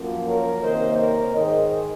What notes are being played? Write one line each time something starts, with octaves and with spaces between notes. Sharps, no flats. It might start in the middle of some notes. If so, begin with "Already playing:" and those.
Already playing: F#2 F3 A#3
A#4 C#5
C3 D#3 A#3 C5 D#5
A#4 C#5
G#2 D#3 G#3 C5 D#5